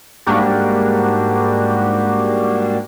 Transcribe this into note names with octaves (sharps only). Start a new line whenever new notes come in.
G#2 G3 A#3 D4 F#4 G4